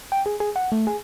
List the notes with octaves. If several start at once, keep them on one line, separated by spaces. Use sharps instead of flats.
G5
G#4
G#4
F#5
A3
G#4